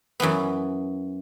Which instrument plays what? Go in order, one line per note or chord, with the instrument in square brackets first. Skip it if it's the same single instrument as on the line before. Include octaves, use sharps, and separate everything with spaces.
[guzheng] F#2 E3 B3